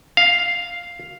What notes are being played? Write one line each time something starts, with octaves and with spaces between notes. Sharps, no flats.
F5